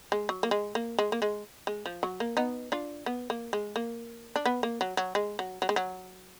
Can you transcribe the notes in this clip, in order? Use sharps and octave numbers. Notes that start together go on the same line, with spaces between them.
G#3
F#3
A#3
G#3
A#3
G#3
A#3
G#3
G#3
F3
F#3
A#3
B3 D#4
D4 F4
B3
A#3
G#3
A#3
D4
B3
A#3
F#3
F#3
G#3
F#3
F#3
G#3
F#3